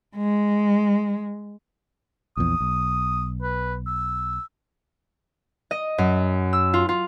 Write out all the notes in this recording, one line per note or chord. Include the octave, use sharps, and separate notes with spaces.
G#3
A#1 E2 D#6
B1
B4
E6
D#5
F#2
E6
F4
F4